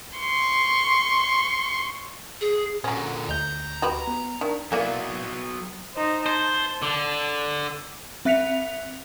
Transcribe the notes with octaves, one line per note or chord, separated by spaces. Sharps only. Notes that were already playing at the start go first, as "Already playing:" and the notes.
C6 C#6
G#4
A#2 D3 F#3 C#4
D2 D#5 A#5 G6
F#4 G4 B4
B3
D#3 D4
E3 F#3 A#3 B3 D5
D#4 C5
C5 A5
D3
C4 E5 F#6 B6 C#7 F7